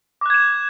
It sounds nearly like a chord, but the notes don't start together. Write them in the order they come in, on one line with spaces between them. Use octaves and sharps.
D6 F#6 G#6 E7